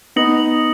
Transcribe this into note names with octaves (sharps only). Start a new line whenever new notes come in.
B3 D#4 D#6 A#6 C#7 F#7